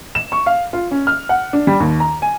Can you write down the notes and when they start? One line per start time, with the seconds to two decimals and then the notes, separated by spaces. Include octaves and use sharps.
0.15 E7
0.32 C#6
0.46 F5
0.73 F4
0.91 C#4
1.07 F6
1.29 F#5
1.53 D4
1.67 G3
1.80 D#2
2.00 A#5
2.22 G#5